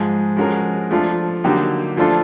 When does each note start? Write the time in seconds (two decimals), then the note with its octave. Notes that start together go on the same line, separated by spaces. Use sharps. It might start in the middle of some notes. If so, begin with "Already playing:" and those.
Already playing: G#2 F3 G#3
0.37 F3 G#3 C#4 F#4 A#4
0.91 F3 A3 D4 F4
1.44 D3 F#3 A#3 D#4 G4
1.97 F3 A3 D4 F4 A4